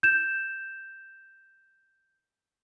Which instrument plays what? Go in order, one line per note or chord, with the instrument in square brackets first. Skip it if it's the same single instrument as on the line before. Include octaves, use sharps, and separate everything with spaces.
[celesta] G6 E7